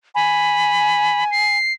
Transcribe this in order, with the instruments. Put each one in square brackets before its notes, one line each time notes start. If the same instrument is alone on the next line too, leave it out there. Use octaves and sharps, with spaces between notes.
[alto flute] G#5 [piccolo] B5
[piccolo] C7